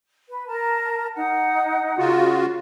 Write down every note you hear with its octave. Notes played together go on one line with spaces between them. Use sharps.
B4
A#4 A5
D#4 F#5
C#3 F4 F#4